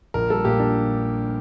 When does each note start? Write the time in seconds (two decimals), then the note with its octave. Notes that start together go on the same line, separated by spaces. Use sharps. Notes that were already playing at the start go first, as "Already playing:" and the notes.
0.14 A#1 A#4
0.30 G3 A4
0.45 A#2 G4
0.59 D4